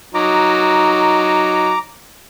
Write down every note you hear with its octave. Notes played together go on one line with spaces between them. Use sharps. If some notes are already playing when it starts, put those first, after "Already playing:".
F#3 D#4 A#5 D6